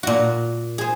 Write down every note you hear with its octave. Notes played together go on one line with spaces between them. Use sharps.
A#2 F#4
G#4 C5